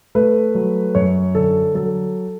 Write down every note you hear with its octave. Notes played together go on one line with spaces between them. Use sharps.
A3 B4
F#3
F#2 C#5
D3 A4
F#3 A4